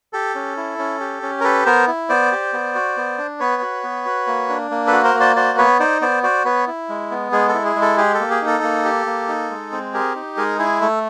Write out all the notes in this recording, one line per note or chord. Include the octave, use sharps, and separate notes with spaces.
G4 A4
C#4
E4
C#4
G4
C#4
A#4
G4 A4 B4
B3 A#4 C5
E4
B3 C5 D5
G4
B3
F#4
B3
D4
B3 B4 C#5
F#4
B3
F#4
A#3
D4
A#3
A4 B4
F#4
A#4 C5
A#3
C5 D5
F#4 C5 D5
B3 B4 C#5
D#4 C5 D5
B3 C5 D5
F#4 C5 D5
B3 B4 C#5
E4
G#3
B3
G#3 G#4
A4
E4
G#4
G#3
A4
G4 G#4
A4
A#3
G#4
D#4
A4
A#3
G4
A#3
D#4
G#3
C4
G4 G#4 A#4
D#4
G#3 G#4 A#4
E4 G#4
A3 A4